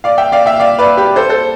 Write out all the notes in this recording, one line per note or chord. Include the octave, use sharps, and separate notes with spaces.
D5 F5
E5 G5
D5 F5
E5 G5
D5 F5
B4 D5
G4 B4
A4 C5
A4 C5